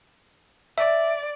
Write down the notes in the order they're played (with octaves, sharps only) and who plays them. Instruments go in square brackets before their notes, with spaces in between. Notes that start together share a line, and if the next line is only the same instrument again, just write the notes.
[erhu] D5 [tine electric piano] E5